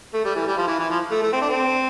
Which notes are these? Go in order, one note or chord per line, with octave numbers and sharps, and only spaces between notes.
A3
G3
E3
G3
F3
E3
E3
F3
A3
A3
C4
D4
C4